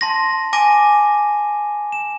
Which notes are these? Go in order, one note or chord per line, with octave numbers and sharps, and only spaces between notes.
A5 C6 A#6
G#5 D6 A#6 D#7
E7